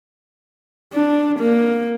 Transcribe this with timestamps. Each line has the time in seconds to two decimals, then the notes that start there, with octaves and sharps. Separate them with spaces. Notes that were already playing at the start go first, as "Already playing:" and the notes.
0.93 D4
1.39 A#3